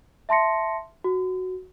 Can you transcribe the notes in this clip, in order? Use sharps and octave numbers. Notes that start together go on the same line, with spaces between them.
E5 A5 C6 A#6 C#7
F#4